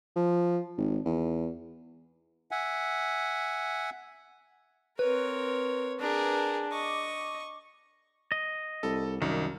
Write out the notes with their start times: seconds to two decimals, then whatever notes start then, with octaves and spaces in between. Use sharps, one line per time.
0.16 F3
0.77 G#1
1.05 E2
2.51 E5 F#5 G#5
4.99 C4 A#4 B4 C#5
6.00 D4 G#4 A#4
6.72 D#5 C#6 D6
8.32 D#5
8.83 C2 A4
9.22 C2 F#2 D#3